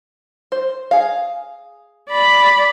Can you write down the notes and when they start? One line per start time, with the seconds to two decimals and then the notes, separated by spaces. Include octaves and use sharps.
0.52 C5
0.91 G#4 F5
2.10 D5 B5